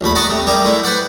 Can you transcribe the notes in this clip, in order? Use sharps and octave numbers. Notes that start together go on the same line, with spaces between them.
A#1 D#2 A3 B5
D5 D#5 F#5 A5 A#5 C#6
C3 A3
G3 G4 G#4 A#4
G#3 A3 E4
B4 C5 D5 F#5